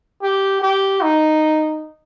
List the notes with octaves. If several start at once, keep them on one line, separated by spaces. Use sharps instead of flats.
G4
G4
D#4